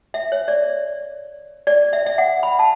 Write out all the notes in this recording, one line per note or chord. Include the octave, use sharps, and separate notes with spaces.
E5
C#5
D5
D5
E5
E5
F#5
B5
A5